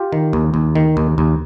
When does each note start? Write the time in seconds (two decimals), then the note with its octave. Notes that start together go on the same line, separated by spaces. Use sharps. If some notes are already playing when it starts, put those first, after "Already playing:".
Already playing: F4 G4
0.12 D#3
0.33 D#2
0.54 D#2
0.75 D#3
0.97 D#2
1.18 D#2